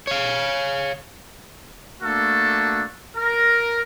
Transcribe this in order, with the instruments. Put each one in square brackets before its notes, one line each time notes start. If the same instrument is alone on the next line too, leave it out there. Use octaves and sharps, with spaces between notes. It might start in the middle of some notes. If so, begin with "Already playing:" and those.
[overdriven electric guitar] C#5 F5
[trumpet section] A3 A#3 D4 F#4 A4
A#4